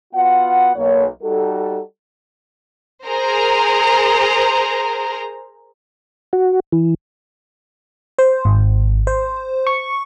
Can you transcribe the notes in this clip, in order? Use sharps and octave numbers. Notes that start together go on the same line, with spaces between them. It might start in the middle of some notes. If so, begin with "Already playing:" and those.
B3 F4 F#4 F#5
B1 A#3 C#5
G3 D#4 F#4 A4
G#4 A#4 C5 A#5
F#4
E3
C5
G#1
C5
C#6